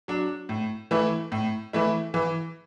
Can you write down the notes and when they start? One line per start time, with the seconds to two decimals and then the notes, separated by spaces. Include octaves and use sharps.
0.08 F#3 D4
0.49 A2
0.91 E3 A3 E4
1.32 A2
1.73 E3 A3 E4
2.14 E3